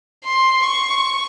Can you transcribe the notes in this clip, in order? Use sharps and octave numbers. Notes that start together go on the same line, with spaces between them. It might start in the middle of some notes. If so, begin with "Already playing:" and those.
C6
C#6